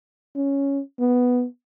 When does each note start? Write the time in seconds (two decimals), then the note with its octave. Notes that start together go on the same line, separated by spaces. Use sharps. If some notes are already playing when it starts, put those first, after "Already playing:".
0.36 C#4
1.00 B3